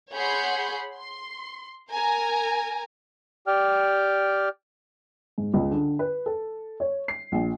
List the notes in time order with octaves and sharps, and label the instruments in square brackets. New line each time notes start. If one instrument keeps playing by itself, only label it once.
[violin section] G#4 C#5 F#5 B5 C6 G6
C6
A#4 G#5 A#5
[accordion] G4 D5 G5 F6
[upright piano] G#2
C#2
D3
B4
A4
C#5
C7
A#1